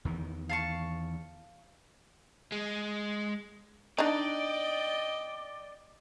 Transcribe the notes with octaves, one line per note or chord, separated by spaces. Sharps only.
E2 D#3 E3
F5 A5 C#6
G#3
D4 D#4 D5 D#5 G5